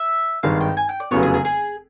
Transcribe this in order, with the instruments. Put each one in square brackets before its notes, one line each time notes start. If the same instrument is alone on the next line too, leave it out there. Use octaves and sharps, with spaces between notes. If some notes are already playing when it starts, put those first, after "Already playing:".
Already playing: [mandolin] E5
[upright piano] G#1 G2 D#3 G#3 [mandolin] F5
[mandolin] G5
G#5
G5
D5
[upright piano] F1 E2 C#3 F#3 B3 [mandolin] C#5
[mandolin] G#4
G#4
G#4